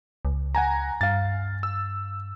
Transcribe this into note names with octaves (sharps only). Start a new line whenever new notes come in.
C#2
F#5 G#5 A#5
G2 F5 A6
E6